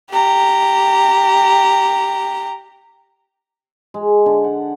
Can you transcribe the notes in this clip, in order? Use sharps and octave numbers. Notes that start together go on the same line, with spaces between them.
G4 A#5
G#3
D3
F#5